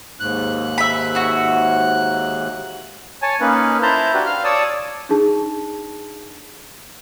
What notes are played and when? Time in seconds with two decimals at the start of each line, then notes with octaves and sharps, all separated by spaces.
0.20 D#2 G#2 F#6
0.78 E5 B5
1.15 E4 F#4
3.22 C#5 G#5 A5
3.40 A#3 C#4 D#4 B4
3.82 E4 C5 E5 A5 A#5 G6
4.14 D4 F#4 G4 B4
4.25 F5 F6
4.44 C#5 D5 A5 D#6 E6
5.09 D4 D#4 G#4 A5